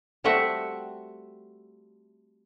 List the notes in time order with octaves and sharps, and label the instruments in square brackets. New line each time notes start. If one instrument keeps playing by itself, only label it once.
[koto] G3 A3 C4 F#4 E5 F#5